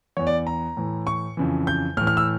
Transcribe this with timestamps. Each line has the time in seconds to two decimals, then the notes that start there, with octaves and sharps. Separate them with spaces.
0.17 E2 E3 C#5
0.27 D5
0.47 A#5
0.77 A2 E3
1.07 C#6
1.37 F2 C#3 E3
1.67 G6
1.97 A2 F6
2.01 E3
2.07 F6
2.17 E6